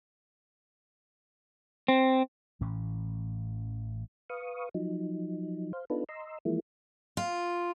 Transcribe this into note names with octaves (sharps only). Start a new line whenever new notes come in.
C4
A1 A2 E3 C#4
B4 F5 C#6 D#6
F3 F#3 D#4
C5 F5
B3 D4 D#4 F4 A4 B4
D#5 A#5 C6 E6
E3 F3 G#3 A#3 E4
F4